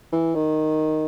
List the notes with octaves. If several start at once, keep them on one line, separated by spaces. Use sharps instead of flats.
E3
D#3